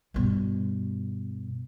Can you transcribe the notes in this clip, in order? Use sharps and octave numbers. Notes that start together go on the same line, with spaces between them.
G2 B2